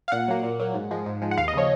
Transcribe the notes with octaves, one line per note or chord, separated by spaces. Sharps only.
F5
A#2 F#5
F#3 A#3
A#2
F#3 A#3
G#2
F3 G#3
G#2
F3 G#3
F#5
D#2 F5
D#5
C#3 F3 C#5